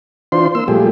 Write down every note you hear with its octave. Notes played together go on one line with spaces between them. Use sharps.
E3 D4 F4 C5 C6
A#3 C6 E6
A#2 F3 G3 A3 G4 G#4